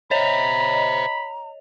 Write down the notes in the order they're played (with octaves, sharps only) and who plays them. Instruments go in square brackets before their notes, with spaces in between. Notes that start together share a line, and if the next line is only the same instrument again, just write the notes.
[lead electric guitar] C5 E5 [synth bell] C#5 D#5 F7 [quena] A#5 [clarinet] B5